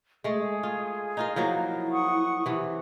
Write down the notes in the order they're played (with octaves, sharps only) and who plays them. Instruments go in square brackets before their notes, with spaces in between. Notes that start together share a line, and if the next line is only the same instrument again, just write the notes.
[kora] G#3 A3 [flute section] G#4
[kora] F4
D#4 F4 A#4
[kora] F3 F#3 A#3 [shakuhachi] E4
[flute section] F#5 C#6 D#6
[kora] C3 E3